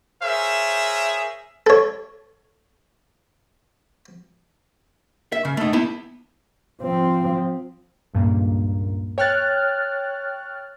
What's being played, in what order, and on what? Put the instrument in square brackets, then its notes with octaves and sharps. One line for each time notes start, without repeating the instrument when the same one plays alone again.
[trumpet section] G#4 A#4 C5 C#5 E5
[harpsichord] A4 C#5
[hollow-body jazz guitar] E5
C#3
A3 D#4
B3 E4
[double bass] F3 C4
[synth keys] C#2 G2 A#2 A#3
C#5 G5 F6 F#6 A6